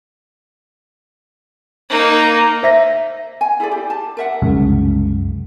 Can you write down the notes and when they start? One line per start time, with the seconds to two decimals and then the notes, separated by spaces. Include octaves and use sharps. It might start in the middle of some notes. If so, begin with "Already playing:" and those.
1.89 A#3 D#4
2.63 C5 E5 A#6
3.41 G#5
3.60 E4 G#4 A4 D5
3.72 G4
3.90 A5
4.17 A#4 E5 F#5
4.42 C2 F#2 C#3 G#3